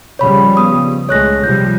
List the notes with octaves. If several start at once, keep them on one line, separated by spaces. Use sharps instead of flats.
C#3 F3 G3 C#5 B5
B3 D#6
C#2 G#3 A3 C#5 F#6 A#6
C3 F3 G3 G6